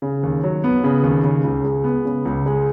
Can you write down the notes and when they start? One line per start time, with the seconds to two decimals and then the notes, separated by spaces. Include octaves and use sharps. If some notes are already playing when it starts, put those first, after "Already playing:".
0.02 C#3
0.23 D#2
0.44 F#3
0.64 B3
0.84 C#3
1.03 D#2
1.24 C#3
1.44 C#2
1.64 G#3
1.84 B3
2.05 C#3
2.25 C#2
2.46 G#3